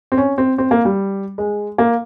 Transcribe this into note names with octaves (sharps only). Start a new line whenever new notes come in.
C4
C#4
C4
C4
A#3
G3
G#3
A#3